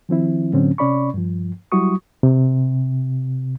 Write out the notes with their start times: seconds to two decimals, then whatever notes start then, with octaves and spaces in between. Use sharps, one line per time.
0.09 D#3 F3 C4 E4
0.53 A2 D3 F#3 C4 C#4
0.78 C3 C#4 D5 B5 C#6
1.14 G2 F3
1.72 F#3 G3 E4 F#4 C#6 D#6
2.23 C3